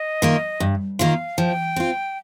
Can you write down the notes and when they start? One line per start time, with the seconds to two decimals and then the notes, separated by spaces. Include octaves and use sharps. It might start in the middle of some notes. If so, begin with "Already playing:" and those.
Already playing: D#5
0.22 D#3 A#3 F4
0.60 G2
0.99 D#3 A#3 F4 F5
1.38 F3 G5
1.76 C4 F4